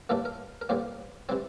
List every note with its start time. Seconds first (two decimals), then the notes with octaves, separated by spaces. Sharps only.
0.09 A2 E3 G3 A#3 A4
0.25 A#4
0.61 A#4
0.69 A2 E3 G3 A#3 C5
1.29 C3 E3 G3 C4 C5